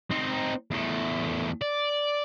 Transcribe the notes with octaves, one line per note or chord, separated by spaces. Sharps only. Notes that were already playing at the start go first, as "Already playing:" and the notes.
C4 D#4
E2 A3
D5